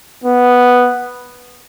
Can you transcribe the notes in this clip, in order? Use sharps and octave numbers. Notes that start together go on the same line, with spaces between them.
B3